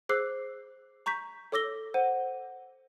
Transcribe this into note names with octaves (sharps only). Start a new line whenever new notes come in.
G#4 C5 D6 E6 F#6 C7
A#5 C#6 G6 B6
A4 C#5 D6 E6 A#6 G7
C5 F#5 D#7